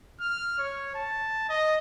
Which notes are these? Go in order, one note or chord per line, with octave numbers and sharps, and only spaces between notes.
F6
C#5
A5
D#5